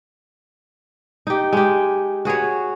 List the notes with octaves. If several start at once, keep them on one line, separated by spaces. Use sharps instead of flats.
D#4 G4
G#3 G4
F#4 G#4 B4 C#5